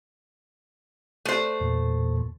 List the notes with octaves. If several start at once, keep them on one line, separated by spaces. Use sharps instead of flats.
A3 C5
E2 A#2